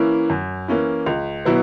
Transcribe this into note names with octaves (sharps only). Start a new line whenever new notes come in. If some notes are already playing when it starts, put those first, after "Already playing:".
Already playing: E3 A#3 C#4 E4
F#2
E3 A#3 C#4 E4
C#2
B2 F#3 B3 E4